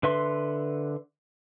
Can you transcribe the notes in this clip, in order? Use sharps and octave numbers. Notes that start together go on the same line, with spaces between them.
D3 B4 E5 C6